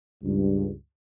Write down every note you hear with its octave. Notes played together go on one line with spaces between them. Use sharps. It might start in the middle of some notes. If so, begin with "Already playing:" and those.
C#2 G2